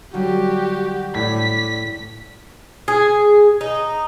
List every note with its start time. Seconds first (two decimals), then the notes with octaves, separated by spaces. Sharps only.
0.14 D3 F#3 G3 F#4 G4
1.15 A2 D5 B6
2.88 G#4
3.61 D#4